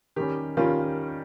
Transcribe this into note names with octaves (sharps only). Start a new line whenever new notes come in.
D#3 G3 C#4 G4
D#3 G3 C#4 F4